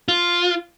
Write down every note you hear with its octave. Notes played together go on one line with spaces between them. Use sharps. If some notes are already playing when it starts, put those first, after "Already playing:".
F4